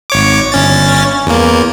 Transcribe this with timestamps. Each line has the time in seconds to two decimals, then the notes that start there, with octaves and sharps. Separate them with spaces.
0.10 G#1 C#5 D6
0.52 G1 C#4 A6
1.27 E2 A#3